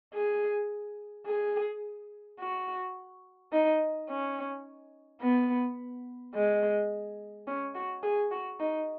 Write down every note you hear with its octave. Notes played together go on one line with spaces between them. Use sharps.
G#4
G#4
F#4
D#4
C#4
B3
G#3
C#4
F#4
G#4
F#4
D#4